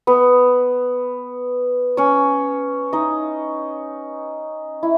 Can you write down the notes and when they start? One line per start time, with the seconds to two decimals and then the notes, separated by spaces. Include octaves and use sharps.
0.07 B3 B4
1.97 C#4 C#5
2.93 D#4 D#5
4.83 E4